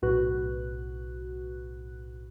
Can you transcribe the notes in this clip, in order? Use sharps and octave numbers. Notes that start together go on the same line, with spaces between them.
B1 A2 F#4 B4 F#6